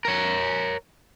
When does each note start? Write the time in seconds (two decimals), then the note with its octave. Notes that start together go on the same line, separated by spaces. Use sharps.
0.05 A#4 C#5